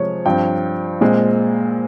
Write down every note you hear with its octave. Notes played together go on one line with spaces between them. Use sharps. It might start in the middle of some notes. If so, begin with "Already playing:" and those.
Already playing: C3 F3 G#3 C#5
G2 F3 C4 G5
A#2 G#3 C4